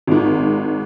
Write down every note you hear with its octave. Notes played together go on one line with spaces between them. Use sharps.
G#1 G#2